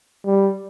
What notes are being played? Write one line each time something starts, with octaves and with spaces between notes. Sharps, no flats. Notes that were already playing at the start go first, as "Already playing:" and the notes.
G3